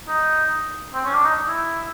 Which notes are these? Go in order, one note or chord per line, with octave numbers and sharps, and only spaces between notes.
D#4
C4
C#4
D4
D#4
E4